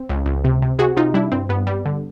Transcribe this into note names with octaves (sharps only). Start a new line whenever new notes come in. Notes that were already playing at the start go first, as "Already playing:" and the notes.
Already playing: C4
C#2
C#2
C3
C3
C3 F#4 G#4
C3 D#4 F4
G3 D4 E4
G2 C4
G2 B3
G3
D3